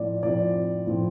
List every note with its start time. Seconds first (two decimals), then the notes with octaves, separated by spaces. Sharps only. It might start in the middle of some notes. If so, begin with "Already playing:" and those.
Already playing: A2 F3 C4 D5
0.23 A2 F3 C4 D5
0.87 A2 F3 C4